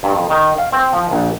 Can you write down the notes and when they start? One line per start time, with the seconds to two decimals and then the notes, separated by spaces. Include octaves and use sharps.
0.03 G2
0.15 F2
0.30 D#3
0.58 F5
0.72 C4
0.93 F3
1.11 A#1